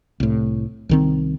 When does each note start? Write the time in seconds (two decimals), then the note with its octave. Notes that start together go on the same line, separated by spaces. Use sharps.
0.20 C2 A2
0.89 C2 D#3 C4